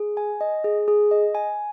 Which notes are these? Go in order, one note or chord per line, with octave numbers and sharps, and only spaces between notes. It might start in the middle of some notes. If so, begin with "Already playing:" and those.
Already playing: G#4
G#5
D#5
G#4
G#4
D#5
G#5